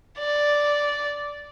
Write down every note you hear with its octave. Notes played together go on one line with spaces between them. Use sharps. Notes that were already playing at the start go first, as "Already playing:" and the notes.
D5